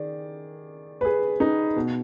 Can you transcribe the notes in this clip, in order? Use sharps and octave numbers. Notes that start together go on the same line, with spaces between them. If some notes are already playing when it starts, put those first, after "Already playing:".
Already playing: D#3 G#4 D5
B4
G#4
D#4
B2